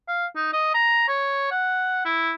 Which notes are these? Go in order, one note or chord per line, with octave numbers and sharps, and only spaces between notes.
F5
D#4
D#5
A#5
C#5
F#5
E4